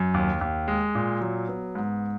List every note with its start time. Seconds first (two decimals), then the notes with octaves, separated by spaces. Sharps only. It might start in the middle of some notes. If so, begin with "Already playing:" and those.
Already playing: F#2
0.14 D#2
0.41 D#2
0.68 G#3
0.95 A#2
1.21 F#3
1.49 B3
1.75 G#2